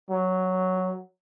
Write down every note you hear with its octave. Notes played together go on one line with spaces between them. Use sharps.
F#3